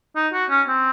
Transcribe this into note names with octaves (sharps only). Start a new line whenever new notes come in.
D#4
F#4
C#4
C4